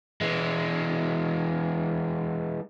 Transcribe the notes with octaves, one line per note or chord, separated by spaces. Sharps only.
E3 G#3